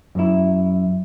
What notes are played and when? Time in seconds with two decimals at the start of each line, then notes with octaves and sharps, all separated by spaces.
0.15 F#2 E4